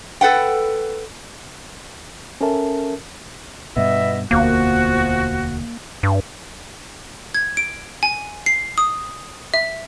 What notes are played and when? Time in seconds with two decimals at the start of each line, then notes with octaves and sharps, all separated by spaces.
0.21 A4 B4 F#5 G5
2.41 C#4 A4 A#4 E5 A5
3.76 G2 B2 B3 D#5 E5
4.31 E1 D2 F3 A#3 B3 F#4
6.03 G2
7.35 G#6
7.57 D7
8.03 G#5
8.46 C7
8.78 D#6
9.54 E5